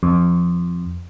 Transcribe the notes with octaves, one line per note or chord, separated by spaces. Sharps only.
F2